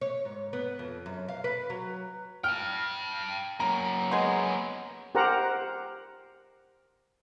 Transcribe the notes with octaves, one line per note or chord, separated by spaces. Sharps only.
C#5
G#2
B3
F2
F#2
F5
B4
F#3
G5 A5 F6
F#3 A#3 A#5
G#3 B3
G4 A#4 C5 F#5 A#5